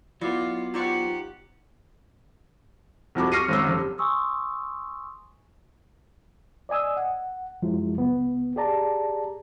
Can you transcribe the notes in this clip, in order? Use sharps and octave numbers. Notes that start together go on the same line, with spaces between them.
F#3 B3 E4 F4 D5 D6
D#4 F4 G4 C5 D5 F#5 C#6
C2 F2 F#4 D6
C#6 F6 A#6 C7 C#7 D#7
G#1 F#2 E6
F1
G#5 C6 C#6 D#6 E6
D5 D#5 G#5 D#6 E6
F#5
F#2 F3 F#3 G#3 E4
C#2 B3
G4 G#4 D5 A5 A#5